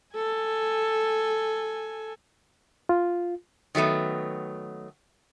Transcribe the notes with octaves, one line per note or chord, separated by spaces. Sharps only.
A4 G#5
F4
D#3 F#3 A3 B3